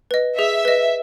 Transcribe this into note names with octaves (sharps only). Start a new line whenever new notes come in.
B4 D#5
G#4 E5
B4 D#5